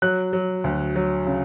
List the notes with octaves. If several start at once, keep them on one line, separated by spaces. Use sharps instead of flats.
F#3 F#6
F#3
D2
F#3
C#3